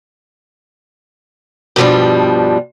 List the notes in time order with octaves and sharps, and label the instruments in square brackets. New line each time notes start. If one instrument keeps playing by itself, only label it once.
[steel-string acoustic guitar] G2 B2 F3 G3 D4